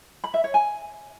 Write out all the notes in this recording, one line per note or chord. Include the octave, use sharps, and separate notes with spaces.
B5
E5
C#5
G#5